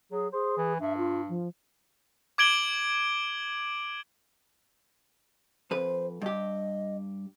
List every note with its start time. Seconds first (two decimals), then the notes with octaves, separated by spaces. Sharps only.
0.12 F#3 G#4
0.33 G#4 C5
0.57 E3
0.80 G2 E5
0.98 F4
1.29 F3
2.38 D6 G#6 D7 F#7 G7
5.71 F2 B4 C5
6.22 G2 G4 D#5